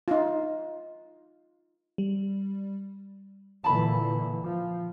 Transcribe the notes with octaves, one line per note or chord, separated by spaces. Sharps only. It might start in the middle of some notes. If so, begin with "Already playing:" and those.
D#4 F4
G3
A#2 D3 E3 A5 B5
F3